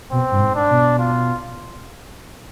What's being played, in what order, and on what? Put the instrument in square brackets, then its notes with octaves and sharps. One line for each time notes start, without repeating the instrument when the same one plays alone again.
[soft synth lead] B2 [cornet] C4
[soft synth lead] G2
G#2
[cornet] D4
[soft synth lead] B2
[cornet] F4